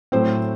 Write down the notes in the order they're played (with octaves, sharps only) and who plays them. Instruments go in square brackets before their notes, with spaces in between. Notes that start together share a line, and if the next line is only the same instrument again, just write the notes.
[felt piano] A2 F#3 A3 C4 C5